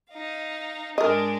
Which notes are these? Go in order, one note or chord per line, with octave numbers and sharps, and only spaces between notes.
D#4 F5
G#2 G#3 D4 A#4 D#5